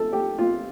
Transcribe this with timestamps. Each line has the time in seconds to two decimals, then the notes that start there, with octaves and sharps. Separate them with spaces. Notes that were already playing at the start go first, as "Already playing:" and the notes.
Already playing: A4
0.13 G4
0.38 F4